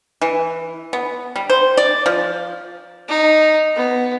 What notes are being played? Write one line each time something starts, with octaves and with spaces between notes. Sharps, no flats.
E3
B3
G3
C5
D5
F3
D#4
B3